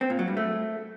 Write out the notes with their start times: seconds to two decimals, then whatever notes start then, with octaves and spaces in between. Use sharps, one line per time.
0.01 C4
0.10 A#2
0.19 F#3
0.28 G2
0.37 A3